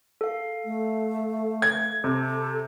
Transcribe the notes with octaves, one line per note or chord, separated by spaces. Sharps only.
A4 F5
A3
G#6
C3 A4